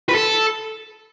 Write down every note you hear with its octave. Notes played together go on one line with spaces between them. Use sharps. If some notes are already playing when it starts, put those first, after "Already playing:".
B4
A4